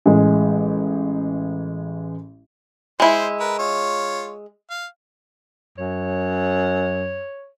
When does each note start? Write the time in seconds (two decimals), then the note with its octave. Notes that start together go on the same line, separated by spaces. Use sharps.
0.06 A1 G#3
3.00 G#3 E4 C5
3.40 A#4 B4
3.59 F4 C#5
4.71 F5
5.78 F#2 C#5